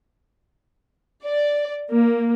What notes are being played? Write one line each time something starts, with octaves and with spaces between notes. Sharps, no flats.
D5
A#3